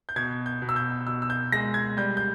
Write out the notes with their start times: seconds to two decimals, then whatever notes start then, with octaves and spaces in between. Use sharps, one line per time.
0.09 G6
0.16 B2 G#6
0.46 G6
0.62 B2
0.69 E6
0.76 G6
1.07 B2 E6
1.22 E6
1.30 G6
1.52 G#3 A#6
1.74 G#6
1.97 G3 G6
2.17 G6